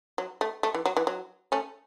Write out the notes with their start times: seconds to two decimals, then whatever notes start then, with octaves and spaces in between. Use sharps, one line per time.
0.18 F#3
0.41 A3
0.63 A3
0.75 E3
0.86 F#3
0.97 E3
1.07 F#3
1.52 A3 C#4